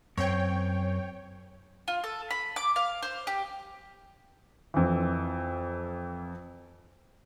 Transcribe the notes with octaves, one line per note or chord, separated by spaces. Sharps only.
F#2 C4 C#5 G5
F4
A4
B5
D6
F5
C5
G4
F2 E3